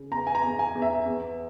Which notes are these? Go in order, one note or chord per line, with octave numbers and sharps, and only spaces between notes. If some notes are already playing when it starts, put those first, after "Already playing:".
Already playing: C#3
E2 A#5
G#5
A#5
E2
G#5
E2
E5
E2